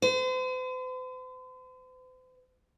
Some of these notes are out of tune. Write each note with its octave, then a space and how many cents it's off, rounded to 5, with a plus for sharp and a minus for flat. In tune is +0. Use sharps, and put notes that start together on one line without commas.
C5 -45